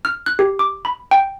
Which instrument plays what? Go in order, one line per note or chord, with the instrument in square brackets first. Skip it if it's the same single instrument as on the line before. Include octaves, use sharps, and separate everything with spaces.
[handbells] F6
F#6
G4
D6
B5
G5